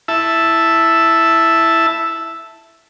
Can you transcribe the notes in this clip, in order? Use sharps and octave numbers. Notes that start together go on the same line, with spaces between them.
E4 E5 A5